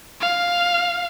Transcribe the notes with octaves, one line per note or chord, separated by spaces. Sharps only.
F5